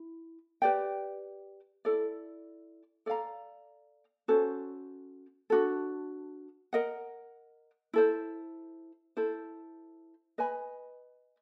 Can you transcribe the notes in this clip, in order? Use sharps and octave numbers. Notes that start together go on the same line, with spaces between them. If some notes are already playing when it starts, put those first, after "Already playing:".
Already playing: E4
G4 B4 D5 G5
E4 A4 D5
A4 D5 F5 A#5
C#4 F#4 A4 C5
D4 F#4 A4
A#4 D#5 F#5
E4 A4 C5
E4 A4 C5
B4 D#5 G#5 B5